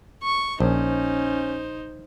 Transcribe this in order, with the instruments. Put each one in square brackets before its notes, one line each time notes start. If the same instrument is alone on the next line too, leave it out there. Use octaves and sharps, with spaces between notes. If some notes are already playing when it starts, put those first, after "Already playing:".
[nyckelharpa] C#6
[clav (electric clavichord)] A#1 [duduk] C#4 [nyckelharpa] D#4 C5